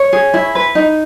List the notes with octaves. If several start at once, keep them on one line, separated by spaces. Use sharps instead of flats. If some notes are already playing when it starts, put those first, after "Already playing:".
Already playing: C#5
G#4
E4
B4
D#4